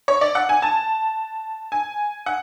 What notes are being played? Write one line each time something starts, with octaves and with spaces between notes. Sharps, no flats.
C#5
D5
F#5
G#5
A5
G#5
F#5